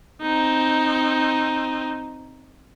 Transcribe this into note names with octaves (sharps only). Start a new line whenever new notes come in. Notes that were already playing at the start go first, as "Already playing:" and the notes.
C4 D#4